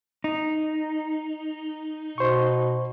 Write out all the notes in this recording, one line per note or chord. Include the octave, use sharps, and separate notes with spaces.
D#4
B2 C5 C#6